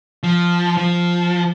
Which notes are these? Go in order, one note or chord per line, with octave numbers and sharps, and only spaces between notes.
F3
F3